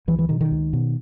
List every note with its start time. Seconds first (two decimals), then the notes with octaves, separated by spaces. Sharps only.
0.08 C#2 E3
0.19 E3
0.29 B2 D#3
0.41 D#3
0.51 C#2
0.73 B2